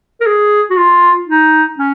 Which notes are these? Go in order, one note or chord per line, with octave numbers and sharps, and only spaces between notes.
A#4
G#4
F#4
F4
D#4
C#4